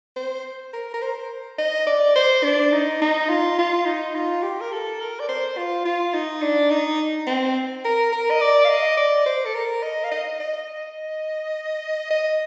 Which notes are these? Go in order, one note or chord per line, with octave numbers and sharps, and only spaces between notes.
C5
A#4
A#4
C5
D#5
D5
C5
D4
D#4
D#4
F4
F4
D#4
F4
G4
A#4
A4
A#4
D5
C5
F4
F4
D#4
D4
D#4
C4
A#4
A#4
D#5
D5
F5
D#5
D5
C5
A4
A#4
D#5
F5
D#5
D#5
D#5